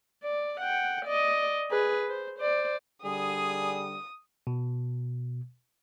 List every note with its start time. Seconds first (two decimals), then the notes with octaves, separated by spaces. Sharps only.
0.23 D5
0.60 F#5 G5
1.06 D5 D#5
1.71 G#4 B4
2.10 C5
2.39 C5 D5
3.04 D3 G3 G#4 D#6
4.47 B2